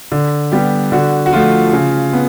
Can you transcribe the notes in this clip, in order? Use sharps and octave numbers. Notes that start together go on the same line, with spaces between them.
D3
G3 B3 G4
D3 F#4
F#4
F3 A3 F4
C#3
B3